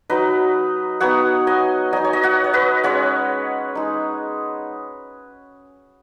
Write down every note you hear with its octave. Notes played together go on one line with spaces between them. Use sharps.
F#3 D#4 B4 D#5
F#3 B3 D#4 C#5 F#5
D#5 G#5
F#3 D#4 D#5 G#5
C#5
D#5
C#5 F#5
C#5
B4 D#5
G#3 C#4 C#5 F#5
G#3 D#4